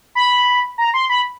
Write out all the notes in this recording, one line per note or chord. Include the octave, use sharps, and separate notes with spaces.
B5
A#5
C6
B5